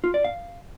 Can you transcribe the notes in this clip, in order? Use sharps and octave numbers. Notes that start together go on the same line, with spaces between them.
F4
D5
F5